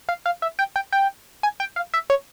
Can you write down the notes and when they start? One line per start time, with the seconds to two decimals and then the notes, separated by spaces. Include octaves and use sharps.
0.09 F5
0.26 F5
0.42 E5
0.59 G5
0.76 G5
0.93 G5
1.43 G#5
1.60 G5
1.76 F5
1.94 E5
2.10 C#5